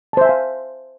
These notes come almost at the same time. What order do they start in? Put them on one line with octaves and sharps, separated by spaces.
A5 C5 E5 G#5 F5